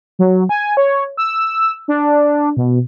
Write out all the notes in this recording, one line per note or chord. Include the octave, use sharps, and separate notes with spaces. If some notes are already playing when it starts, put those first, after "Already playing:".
F#3
G#5
C#5
E6
D4
B2